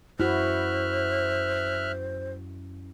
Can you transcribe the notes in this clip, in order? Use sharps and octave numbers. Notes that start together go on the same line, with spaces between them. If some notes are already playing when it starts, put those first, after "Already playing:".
F#2 E4 F#4 C5 E5 F6 F#6